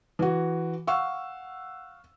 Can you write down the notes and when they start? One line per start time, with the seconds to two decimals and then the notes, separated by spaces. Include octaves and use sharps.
0.19 E3 F#4
0.87 F5 F#5 C#6 E6